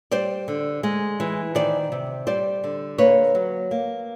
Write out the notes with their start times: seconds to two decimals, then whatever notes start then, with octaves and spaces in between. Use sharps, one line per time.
0.11 G3 C5 D5
0.48 D3
0.83 G#3
1.20 E3
1.55 D#3 C5 D5
1.92 C3
2.27 G3 C5 D5
2.64 D3
2.98 A#3 B4 C#5
3.35 F#3
3.71 A#3